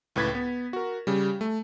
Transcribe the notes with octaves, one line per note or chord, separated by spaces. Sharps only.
C#2 A2 B4 G#6 A6 B6
B3
F#4 A#4
C#3 G3
A3